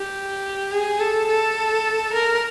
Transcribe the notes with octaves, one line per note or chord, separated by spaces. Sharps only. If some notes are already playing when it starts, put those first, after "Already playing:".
Already playing: G4
G#4
A4
A4
A#4